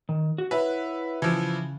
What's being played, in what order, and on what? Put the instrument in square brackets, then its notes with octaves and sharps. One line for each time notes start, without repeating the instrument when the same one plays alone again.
[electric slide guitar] D#3
F#4
[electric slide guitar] E4 C#5 F#5 [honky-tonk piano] B4 E5
[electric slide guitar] C#3 [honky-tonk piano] E3 F3